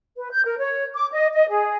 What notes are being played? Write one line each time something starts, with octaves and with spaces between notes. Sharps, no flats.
B4
G6
A#4
C#5
D6
D#5
D#5
G#4